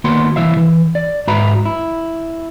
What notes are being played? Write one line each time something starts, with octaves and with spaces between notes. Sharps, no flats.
D#3 A#3 B3 F#4 F#5 C6
C2 E3 E5 F5
E3
D5
G#2 F#4 B4 E5 A#5 B5
E4